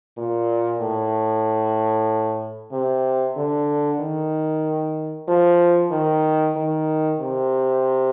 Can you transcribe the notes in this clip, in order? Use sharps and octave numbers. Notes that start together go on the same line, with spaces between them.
A#2
A2
C3
D3
D#3
F3
D#3
D#3
C3